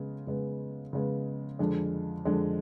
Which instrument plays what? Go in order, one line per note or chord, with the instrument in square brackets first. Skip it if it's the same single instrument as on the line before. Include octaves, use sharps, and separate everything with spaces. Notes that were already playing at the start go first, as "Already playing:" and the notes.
Already playing: [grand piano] C#3 G#3 B3
C#3 G#3 B3
C#3 G#3 B3
F2 D3 G#3
F2 D3 G#3